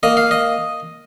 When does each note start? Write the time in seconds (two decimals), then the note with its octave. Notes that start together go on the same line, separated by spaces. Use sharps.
0.03 A#3 D#5
0.17 F5
0.31 D#5